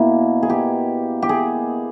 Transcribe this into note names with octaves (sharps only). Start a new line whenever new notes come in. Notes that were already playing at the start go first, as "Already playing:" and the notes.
Already playing: B2 A#3 E4
G#4
G4
G4
G#4